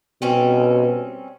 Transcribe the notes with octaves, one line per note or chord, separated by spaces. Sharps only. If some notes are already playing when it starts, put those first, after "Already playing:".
B2 G3 C4 C#4